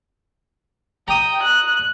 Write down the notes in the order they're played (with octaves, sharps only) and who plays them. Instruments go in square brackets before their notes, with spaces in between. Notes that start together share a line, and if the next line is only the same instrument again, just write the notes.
[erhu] G5 [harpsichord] A#5 D#6
[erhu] F#6